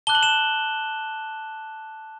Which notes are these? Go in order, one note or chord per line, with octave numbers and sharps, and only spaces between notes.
A5 D6 F#6 G7
F#7
E7 G7